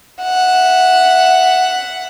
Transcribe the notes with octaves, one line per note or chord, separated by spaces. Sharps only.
E5 F#5